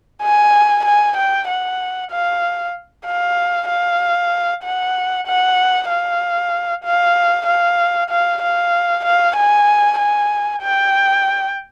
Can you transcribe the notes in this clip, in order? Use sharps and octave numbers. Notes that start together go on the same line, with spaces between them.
G#5
G#5
G5
F#5
F5
F5
F5
F#5
F#5
F5
F5
F5
F5
F5
F5
G#5
G#5
G5